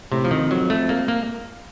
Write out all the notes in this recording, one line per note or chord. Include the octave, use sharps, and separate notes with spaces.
A2 C3
F3
F2 D#3
F#3
A3
A#3
A#3